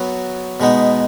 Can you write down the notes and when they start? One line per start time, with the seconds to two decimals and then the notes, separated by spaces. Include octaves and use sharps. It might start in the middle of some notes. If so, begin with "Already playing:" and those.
Already playing: F#3 B3 F#4
0.60 B2 G#3 B3 D#4